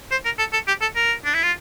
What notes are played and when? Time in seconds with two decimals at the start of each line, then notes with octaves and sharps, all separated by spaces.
0.11 C5
0.25 A#4
0.39 A4
0.53 A4
0.68 G4
0.82 A4
0.95 A#4
1.25 D4
1.34 E4
1.43 F4